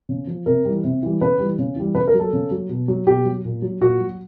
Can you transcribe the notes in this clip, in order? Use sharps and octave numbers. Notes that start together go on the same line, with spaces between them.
C#3
F3
C3 A#4
E3 G3
C3
E3 G3
C#3 B4
E3 G3
C#3
E3 G3
C#3 B4
A#4
F#3
A4
C#3
F#3
B2
F#3
B2 G4
F#3
A#2
F#3
A#2 F#4
F#3